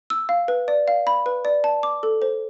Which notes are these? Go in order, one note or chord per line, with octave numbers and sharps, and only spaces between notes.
E6
F5
B4
D5
F5
B5
B4
D5
A5
D6
A4
C5